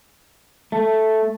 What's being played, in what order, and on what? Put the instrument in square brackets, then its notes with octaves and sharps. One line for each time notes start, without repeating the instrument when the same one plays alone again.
[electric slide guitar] A3